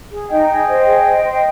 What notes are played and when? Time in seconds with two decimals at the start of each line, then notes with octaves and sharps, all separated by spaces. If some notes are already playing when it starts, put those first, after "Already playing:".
0.12 G#4
0.30 D#4 D#5 G5
0.49 G#4
0.67 C5
0.85 G#4
1.04 C5
1.23 C5